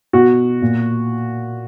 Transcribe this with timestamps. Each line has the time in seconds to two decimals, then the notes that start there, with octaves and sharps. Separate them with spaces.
0.13 B2 F#4
0.62 A#2